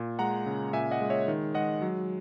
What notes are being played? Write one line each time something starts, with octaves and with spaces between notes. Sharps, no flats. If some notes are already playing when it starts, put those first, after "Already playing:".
Already playing: A#2
G#3 F#5 A#5
C#3
A#2 E5 G#5
D#5 F#5
G#3
C#5 E5
D#3
G#3 D#5 F#5
F#3